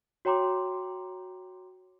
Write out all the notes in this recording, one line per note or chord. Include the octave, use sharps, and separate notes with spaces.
F#4 C#5 G5 A#5 C6 D6